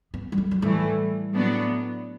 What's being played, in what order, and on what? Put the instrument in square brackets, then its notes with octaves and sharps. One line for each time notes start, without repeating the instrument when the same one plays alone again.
[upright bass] B3
G3
A3
F#3
[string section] A2 E3 A3 [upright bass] G3
[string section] A2 F#3 B3 D4